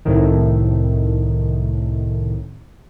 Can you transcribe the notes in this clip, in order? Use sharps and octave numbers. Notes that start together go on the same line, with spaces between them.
C2 A2 C3 D#3